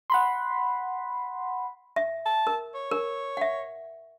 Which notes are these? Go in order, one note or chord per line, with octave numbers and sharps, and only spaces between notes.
F#5 B5 C6
E5
A5
A#4
C#5
A#4
E5 F#5